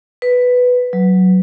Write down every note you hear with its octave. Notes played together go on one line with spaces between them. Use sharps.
B4
F#3